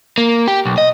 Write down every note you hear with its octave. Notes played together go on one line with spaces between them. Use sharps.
A#3
G4
B1
D#5